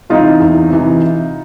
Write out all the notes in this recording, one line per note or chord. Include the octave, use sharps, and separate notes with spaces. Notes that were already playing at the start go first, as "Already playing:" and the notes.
C3 E3 D#4 F4
E2
C3 E3